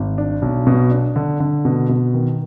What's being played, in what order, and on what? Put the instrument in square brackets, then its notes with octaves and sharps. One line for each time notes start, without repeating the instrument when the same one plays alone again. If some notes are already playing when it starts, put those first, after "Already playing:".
Already playing: [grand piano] G#1
D4
B1
B2
D4
D3
D3
B2
B2
D#3